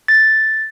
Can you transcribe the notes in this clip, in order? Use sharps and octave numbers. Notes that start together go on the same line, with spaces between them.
A6